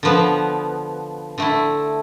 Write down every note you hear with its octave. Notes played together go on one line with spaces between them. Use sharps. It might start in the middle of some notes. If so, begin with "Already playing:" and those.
D3 F3 B3
D3 A3 E4